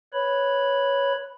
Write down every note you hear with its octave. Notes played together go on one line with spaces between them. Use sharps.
B4 C#5 B5